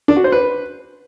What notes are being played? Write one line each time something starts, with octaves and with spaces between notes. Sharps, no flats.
D4
F#4
C5
B4